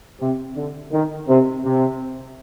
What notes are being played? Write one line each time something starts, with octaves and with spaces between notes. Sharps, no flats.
C3
D3
D#3
C3
C3